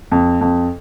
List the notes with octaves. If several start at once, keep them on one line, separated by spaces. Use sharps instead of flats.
F2
F2